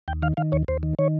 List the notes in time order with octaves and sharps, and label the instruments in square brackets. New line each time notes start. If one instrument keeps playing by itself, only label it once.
[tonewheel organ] D#2 G5
D#3 F5
D#3 F5
D#2 C#5
D#2 C5
D#3
D#3 C#5